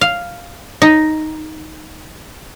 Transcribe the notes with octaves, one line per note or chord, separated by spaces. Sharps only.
F5
D#4